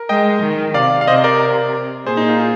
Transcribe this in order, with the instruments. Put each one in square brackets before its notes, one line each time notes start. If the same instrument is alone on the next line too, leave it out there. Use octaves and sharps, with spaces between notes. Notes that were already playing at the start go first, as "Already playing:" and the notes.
Already playing: [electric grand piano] A#4
[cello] G#3 [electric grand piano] D#5 G5
[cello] D#3
[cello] C3 [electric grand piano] D5 F5
[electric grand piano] F5
[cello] C3 [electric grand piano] C5 D#5
[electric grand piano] A#4 D5
[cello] A#2 [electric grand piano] G#4 C5
[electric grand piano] D#4
F4
F4 G#4